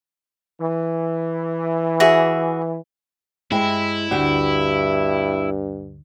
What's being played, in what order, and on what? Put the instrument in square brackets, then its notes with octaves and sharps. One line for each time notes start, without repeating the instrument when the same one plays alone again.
[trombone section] E3
[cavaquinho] F#4 G#4 E5
[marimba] G2 G5 [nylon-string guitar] G#3 C4 [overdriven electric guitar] E4
[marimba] D2 D3 D4 [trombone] G2 [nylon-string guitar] C4 F#4 G4